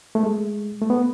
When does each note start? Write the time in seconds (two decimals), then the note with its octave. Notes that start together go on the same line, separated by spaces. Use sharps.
0.15 A3
0.23 G#3
0.82 A3
0.90 B3